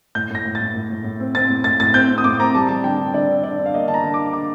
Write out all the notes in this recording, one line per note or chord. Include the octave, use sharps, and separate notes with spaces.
A2 G6
A2 A#6
A2
A6
A2
A2
A2
A2
C4
C4 A6
A2
A2 A6
A2 A6
C4 G6
C4
D#6
A2 D6
C4 A#5
G3 A5
G3 A5
D3 G5
D3
D3 D5
D3
D3 D5
D3
F5
A#3 D#5
D3 A5
A#5
D3
D6
D3
D3 D6